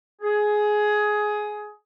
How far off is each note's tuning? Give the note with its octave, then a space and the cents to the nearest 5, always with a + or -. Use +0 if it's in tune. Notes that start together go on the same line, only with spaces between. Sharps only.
G#4 +15